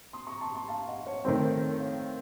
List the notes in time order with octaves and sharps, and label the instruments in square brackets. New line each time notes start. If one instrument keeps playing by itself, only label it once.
[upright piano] C6 D#6
A#5 C#6
A5 C6
A5 C6
F5 A5
D#5 F#5
C#5 F5
[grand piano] D#3 A3 C4 [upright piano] C5 D#5
[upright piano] A#4 C#5
A#4 C#5
C#5 F5